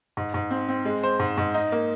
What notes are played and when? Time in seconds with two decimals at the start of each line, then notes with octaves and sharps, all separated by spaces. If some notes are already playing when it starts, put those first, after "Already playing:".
0.17 G#2
0.34 G#2
0.51 C4
0.69 C4
0.85 G#3
1.03 C5
1.19 G#2
1.38 G#2
1.54 D#4
1.72 A#3